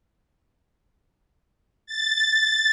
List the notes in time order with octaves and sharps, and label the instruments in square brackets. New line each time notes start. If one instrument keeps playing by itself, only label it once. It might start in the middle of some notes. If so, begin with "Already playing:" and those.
[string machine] A6